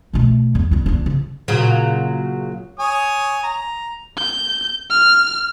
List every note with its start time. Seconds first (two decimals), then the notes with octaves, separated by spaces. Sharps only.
0.13 B2 A3
0.55 E2
0.71 D3 E4
0.86 A#3 D4
1.06 C#3
1.48 A#2 C#3 F#3
2.79 C#5 G#5 D#6
3.43 A#5
4.17 G6
4.90 F6